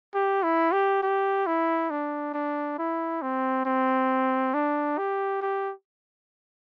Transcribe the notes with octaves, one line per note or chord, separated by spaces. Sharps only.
G4
E4
G4
G4
E4
D4
D4
E4
C4
C4
D4
G4
G4